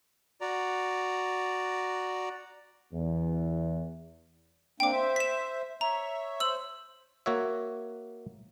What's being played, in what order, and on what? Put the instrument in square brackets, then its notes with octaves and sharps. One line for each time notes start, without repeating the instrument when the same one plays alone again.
[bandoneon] F#4 D5 A#5
[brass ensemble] E2
[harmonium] A#3 C4 D4 [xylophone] G5 D6
[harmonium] C5 E5
[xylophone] B6 E7
[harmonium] C#5 E5 [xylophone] A#5
[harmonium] C5 [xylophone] E6 F#7
[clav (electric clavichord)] A#3 F#4 C#5 E5